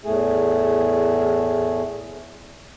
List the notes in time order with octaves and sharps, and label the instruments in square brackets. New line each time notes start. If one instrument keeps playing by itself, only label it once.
[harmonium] E2 A2 A3 G#4